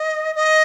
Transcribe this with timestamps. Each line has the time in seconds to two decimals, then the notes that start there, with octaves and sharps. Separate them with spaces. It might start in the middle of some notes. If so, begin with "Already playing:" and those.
Already playing: D#5
0.35 D#5